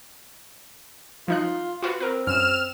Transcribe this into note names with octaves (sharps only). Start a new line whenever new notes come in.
F3 D#4 F4 F#6
F4 F#4 B4
C4 A#4 B4
F#2 F6 E7